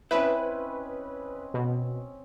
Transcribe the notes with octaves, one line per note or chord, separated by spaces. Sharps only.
C4 C#4 E4 B4 D#5
B2